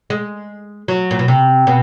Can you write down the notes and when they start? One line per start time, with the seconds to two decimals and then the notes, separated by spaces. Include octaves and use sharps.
0.10 G#3
0.88 F#3
1.11 A#2
1.19 B2
1.28 C3
1.67 B2